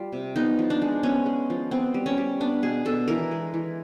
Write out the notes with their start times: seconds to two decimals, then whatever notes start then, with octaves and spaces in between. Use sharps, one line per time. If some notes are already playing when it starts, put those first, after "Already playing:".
Already playing: G3 F4
0.12 C3
0.36 B3 D#4
0.59 F3
0.70 D4
0.82 G#3
1.03 B3 C#4
1.26 G#3
1.50 F3
1.71 B3 C4
1.94 G3
2.06 C#4
2.18 G3
2.40 B3 D4
2.62 B2 G#4
2.85 B2 A4
3.08 E3 A#4
3.31 G#3
3.54 E3